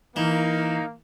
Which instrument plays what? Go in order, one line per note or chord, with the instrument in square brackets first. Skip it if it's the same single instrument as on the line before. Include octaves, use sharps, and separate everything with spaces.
[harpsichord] E3 [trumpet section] A#3 [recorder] D#4